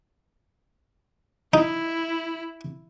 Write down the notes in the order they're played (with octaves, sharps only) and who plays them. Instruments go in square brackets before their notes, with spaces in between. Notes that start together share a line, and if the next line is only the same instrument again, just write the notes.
[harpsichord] D#4 [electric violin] E4